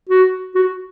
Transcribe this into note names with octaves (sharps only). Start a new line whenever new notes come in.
F#4
F#4